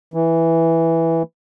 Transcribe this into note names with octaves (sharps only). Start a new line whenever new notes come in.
E3